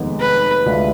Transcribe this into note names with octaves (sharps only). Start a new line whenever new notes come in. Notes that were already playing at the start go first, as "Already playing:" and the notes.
Already playing: F1 D#2 D#3 G#3 B3
B4
D2 D3 G#3 D4 F4